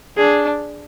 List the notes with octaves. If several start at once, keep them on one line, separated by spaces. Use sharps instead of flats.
D4 G#4